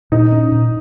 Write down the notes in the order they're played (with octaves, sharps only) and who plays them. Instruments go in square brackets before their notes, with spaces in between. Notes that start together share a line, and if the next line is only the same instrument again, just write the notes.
[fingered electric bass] A#2 [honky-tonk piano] D#4
[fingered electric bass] C#4
A#2